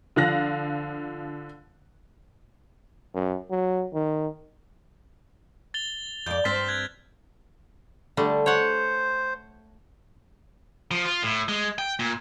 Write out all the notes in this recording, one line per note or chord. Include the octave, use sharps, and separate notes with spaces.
D3 F3 F5 F#6 A#6
F#2
F#3
D#3
A6 F7 G7
F2 D5 G6
G2 C4 C5 F6 A6 B6
F#6 G#6 B6
D3 G3 A3
C5 C#5 F#5
F3
F4
A2
G#3
G5
A#2